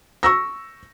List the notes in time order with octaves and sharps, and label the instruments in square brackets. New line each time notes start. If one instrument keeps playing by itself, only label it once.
[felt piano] C#6 E6 A#6